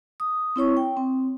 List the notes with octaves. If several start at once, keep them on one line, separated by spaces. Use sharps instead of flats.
D#6
C4 E4 C#5 C#6
G5
C4